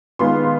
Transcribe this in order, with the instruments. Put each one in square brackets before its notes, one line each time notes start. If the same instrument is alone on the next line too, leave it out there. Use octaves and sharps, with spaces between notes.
[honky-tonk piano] D#3 G#3 B3 F4 [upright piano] C6